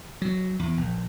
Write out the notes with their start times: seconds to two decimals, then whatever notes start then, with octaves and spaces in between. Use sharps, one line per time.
0.22 F#3
0.59 E2
0.77 A#1